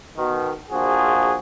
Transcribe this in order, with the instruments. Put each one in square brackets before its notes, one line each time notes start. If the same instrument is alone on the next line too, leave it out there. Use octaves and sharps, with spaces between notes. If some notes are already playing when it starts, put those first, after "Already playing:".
[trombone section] B2 D#3
A#1 F3 F#4 G#4